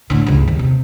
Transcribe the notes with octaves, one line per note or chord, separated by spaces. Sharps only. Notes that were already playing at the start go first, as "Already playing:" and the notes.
A2 D3
C#2 G2
D#2
C3